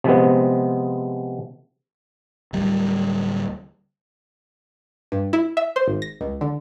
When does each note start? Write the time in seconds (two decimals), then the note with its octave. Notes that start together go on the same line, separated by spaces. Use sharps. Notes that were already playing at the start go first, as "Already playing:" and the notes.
0.04 C3 F3 G#3 B3
2.53 D1 G3
5.12 G2
5.33 E4
5.57 E5
5.76 C5
5.88 G#1
6.02 A#6
6.21 C#2
6.41 D3